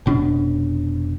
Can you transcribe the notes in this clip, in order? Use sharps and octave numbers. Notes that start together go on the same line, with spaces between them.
F1 B2 C#4 D4